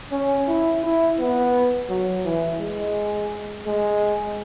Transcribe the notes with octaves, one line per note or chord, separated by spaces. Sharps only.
C#4
E4
E4
B3
F#3
E3
G#3
G#3